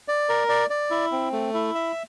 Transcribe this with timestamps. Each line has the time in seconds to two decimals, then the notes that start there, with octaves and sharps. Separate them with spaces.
0.08 D5
0.29 A#4
0.49 D5
0.70 D5
0.91 E4
1.12 C4
1.33 A3
1.54 E4
1.75 E5